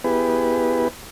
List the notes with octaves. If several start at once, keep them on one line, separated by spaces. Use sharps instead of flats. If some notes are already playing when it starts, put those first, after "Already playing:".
B3 E4 G4 G#4 B4